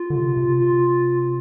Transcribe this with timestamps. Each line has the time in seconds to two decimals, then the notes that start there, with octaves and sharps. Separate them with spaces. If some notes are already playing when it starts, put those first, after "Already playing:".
Already playing: F4
0.10 D3
0.15 C3
0.37 C3
0.59 F4